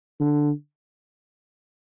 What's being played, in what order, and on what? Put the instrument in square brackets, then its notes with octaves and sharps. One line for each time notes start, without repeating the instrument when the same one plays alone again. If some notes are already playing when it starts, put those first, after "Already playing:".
[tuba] D3